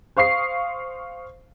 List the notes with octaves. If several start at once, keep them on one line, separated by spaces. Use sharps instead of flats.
C5 F5 C#6 D#6 C7